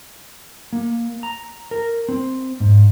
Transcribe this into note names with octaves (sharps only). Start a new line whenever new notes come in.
A#3
A#5
A#4
C4
G#2